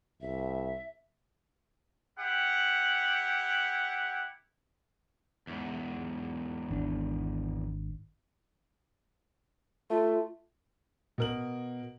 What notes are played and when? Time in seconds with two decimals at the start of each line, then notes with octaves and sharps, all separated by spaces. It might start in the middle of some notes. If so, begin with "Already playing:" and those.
0.21 C2 E5
2.19 E4 G4 F#5
5.47 E2 G#2
6.71 G#1 D4
9.90 A3 F4
11.18 B2 A#4 F#7